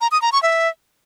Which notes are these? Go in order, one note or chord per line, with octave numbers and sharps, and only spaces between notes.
A#5
D#6
A#5
C#6
E5